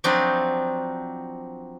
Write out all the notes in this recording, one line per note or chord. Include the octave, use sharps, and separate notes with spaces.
F3 F#3 C4 D4 D#4